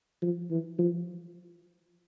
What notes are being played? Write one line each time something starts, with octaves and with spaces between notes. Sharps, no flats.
F3
E3
F3